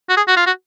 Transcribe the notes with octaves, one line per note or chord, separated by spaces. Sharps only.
F#4
G#4
F#4
F4
F#4